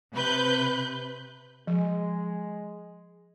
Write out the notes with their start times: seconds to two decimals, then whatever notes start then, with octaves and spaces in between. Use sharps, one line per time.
0.13 C3 B4 B5 F#6 G6
1.67 F3 G#3